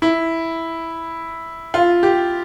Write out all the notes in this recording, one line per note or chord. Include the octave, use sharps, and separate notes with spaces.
E4
F4
G4